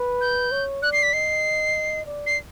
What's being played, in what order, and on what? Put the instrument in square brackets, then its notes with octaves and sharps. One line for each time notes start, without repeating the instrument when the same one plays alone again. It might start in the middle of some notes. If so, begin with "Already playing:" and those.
Already playing: [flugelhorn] B4
[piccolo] G6
[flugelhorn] C#5
[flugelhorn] D5 [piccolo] F#6
[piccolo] C7
B6
[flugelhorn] D#5 [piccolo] C7
[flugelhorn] D5
[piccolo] C7